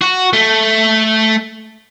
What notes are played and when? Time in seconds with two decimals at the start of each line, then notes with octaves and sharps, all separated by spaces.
0.01 F#4
0.33 A3